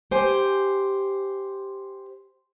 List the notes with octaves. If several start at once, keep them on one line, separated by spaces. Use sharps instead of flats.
G4 C5 G#5